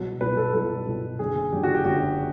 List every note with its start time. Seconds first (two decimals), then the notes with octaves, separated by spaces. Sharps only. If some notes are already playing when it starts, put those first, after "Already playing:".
Already playing: C2 B2 F#3
0.21 C2 B2 F#3 B4
0.37 A4
0.54 C2 B2 F#3 A4
0.86 C2 B2 F#3
1.19 F#1 F#2 D3 G#4
1.52 F#1 F#2 D3 G4
1.63 F#4
1.75 G4
1.85 F#1 F#2 D3 F#4